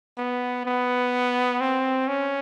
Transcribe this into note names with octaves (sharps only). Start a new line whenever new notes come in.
B3
B3
C4
C#4